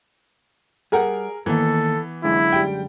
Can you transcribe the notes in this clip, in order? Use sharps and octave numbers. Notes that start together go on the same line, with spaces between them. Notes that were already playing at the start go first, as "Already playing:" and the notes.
G3 G#4 A#4 F#5 G5
D#3 E3 A#3 B3 A4
F#2 D3 G#3 E4
G3 G5